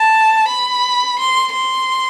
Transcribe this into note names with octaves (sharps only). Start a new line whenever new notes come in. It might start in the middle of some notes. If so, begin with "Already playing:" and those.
Already playing: A5
B5
C6
C6